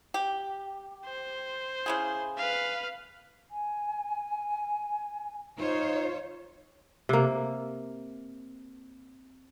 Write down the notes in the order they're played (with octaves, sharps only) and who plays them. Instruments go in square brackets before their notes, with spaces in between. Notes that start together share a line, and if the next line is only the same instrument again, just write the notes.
[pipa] G4
[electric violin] C5
[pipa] C#3 E4 G#4
[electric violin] B4 F5
[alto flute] G#5
[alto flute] D#4 [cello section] F4 C5 C#5
[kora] C3 A#3